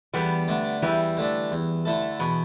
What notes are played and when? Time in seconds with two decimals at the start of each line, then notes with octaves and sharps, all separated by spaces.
0.14 E2 G3 B3
0.48 D3 A3 D4
0.82 E2 E3 G3
1.17 D3 A3 D4
1.51 E2
1.85 D3 A3 E4 A4
2.20 E2 B2